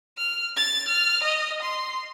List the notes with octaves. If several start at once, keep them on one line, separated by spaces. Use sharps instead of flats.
F6
A6
F6
D#5
C6